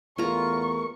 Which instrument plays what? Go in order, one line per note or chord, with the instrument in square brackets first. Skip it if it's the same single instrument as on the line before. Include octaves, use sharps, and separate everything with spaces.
[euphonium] E2 [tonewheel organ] A3 B3 A#4 [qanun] F4 A#5 [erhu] C#6